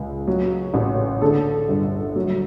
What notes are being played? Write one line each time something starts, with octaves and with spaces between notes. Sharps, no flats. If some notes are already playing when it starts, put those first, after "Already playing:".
Already playing: C#2
F#3
A1
D3 A4
G1
F#3